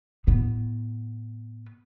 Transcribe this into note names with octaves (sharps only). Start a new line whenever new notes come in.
A2 B3